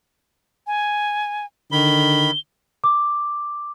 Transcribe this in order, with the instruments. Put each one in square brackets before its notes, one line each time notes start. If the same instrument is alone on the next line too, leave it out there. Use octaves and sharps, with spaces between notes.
[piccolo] G#5
[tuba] D3 [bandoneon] D#3 B5 [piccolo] G7
[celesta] D6